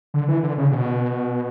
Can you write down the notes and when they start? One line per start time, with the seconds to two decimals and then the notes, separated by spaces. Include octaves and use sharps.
0.14 D3
0.28 E3
0.43 D3
0.58 C#3
0.72 B2